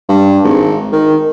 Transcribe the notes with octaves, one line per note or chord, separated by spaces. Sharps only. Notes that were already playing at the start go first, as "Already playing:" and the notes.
G2
G#1
D#3